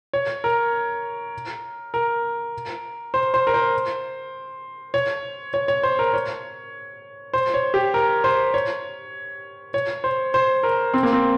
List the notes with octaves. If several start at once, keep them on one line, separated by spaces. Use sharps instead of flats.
C#5
A#4
A#4
C5
C5
A#4
C5
C#5
C#5
C#5
C5
A#4
C#5
C5
C#5
G4
A#4
C5
C#5
C#5
C5
C5
A#4
C4
A#3
C4